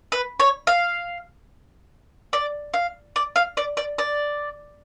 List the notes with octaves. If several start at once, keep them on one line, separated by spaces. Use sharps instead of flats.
B4
C#5
F5
D5
F5
D5
F5
D5
D5
D5